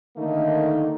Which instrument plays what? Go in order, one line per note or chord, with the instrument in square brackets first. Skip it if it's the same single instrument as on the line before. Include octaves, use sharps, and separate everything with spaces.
[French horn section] D3 D#3 A3 A#3 D#4